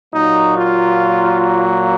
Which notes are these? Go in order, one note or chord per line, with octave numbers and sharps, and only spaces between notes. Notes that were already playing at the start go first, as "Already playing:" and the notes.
A#2 F#3 A#3 D#4
F4